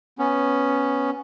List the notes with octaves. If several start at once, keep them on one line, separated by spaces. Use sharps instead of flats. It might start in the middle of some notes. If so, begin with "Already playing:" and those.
B3 C#4